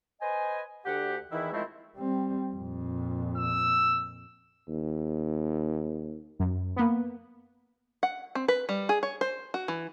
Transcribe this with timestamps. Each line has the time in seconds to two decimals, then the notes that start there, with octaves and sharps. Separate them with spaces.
0.21 B4 C5 D#5 G#5
0.86 D2 G4 F#5
1.32 E2 D#3 E3 E4
1.53 D#3 F3 G#3 A3 C4 E4
1.96 G3 C4
2.54 F2 A#2
3.37 E6
4.68 D#2
6.39 F#2
6.76 A#3 B3
8.03 F#5
8.35 C4
8.48 B4
8.69 G3
8.89 G#4
9.03 C#5
9.21 C5
9.54 F#4
9.68 E3